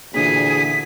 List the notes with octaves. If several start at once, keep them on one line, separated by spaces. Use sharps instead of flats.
D2 A#2 D3 E3 G#4 B6